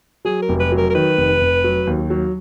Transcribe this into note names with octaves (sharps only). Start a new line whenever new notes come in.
F#3 G#4
A#4
F1
B4
F#3
A#4
A#4
D#3 B4
F1
F1
F#3
D#2
F#3